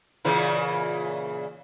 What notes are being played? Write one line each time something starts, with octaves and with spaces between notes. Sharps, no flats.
A#2 C#3 E3